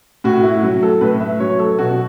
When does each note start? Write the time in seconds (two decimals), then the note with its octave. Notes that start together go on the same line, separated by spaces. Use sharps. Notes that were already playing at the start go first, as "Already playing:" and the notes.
0.24 A2 F#4
0.43 E4
0.63 F#3
0.83 A4
1.01 A2 B4
1.20 E5
1.40 F#3 C#5
1.59 A4
1.78 B2 F#4